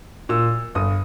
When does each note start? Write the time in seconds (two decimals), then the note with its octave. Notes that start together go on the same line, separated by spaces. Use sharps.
0.29 A#2 E6
0.75 G1 D#6